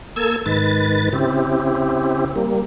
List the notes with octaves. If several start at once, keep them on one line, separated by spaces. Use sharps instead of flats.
A#3 A4 E6 G#6
G#2 D#3 B4 A6
C#3 C4 E4 G4
G3 A#3